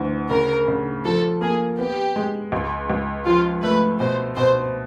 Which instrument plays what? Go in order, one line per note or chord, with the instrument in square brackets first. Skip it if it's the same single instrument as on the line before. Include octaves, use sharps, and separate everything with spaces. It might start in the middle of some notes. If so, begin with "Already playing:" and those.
Already playing: [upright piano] D2 E3
[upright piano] C#3 [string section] A#4
[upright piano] C#3
[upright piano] F3 [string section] A4
[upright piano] A#3 [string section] G#4
[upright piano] B3 [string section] G4
[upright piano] G#3
C#2
C#2
[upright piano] F3 [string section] F4
[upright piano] A3 [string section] B4
[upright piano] B2 [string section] C5
[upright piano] B2 [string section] C5